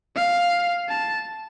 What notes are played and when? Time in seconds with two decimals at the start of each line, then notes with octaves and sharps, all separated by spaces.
0.16 F5
0.89 A5